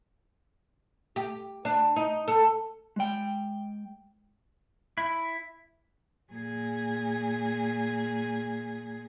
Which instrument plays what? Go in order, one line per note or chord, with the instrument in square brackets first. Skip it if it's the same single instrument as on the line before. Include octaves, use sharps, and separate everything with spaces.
[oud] G4
D4
D#4
A4
[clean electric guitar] G#3 G5
[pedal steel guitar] E4
[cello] A#2 G#4